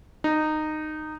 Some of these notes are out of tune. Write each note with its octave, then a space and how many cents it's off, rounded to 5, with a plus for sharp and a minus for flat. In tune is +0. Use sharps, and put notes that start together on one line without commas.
D#4 -15